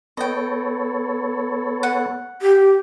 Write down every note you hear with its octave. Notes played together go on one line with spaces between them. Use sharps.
B3 A4 C#5 D#5 G5
F#5
G4